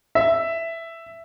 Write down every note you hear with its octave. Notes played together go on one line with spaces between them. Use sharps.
E5